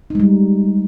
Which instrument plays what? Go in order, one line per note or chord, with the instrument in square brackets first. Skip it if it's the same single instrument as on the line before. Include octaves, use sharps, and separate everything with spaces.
[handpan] D#4
G#3
G3